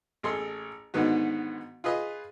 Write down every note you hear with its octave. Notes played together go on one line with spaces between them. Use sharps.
A1 G#4 A4 C6
G#2 D3 D#3 B3 F#4
F4 G#4 B4 D#5